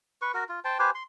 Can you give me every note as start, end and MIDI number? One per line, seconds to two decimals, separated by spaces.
0.22 0.32 71
0.22 0.32 85
0.34 0.44 66
0.34 0.44 70
0.49 0.60 65
0.64 0.78 72
0.64 0.78 79
0.64 0.78 81
0.79 0.90 67
0.79 0.90 71
0.79 0.90 72
0.79 0.90 80
0.95 1.03 84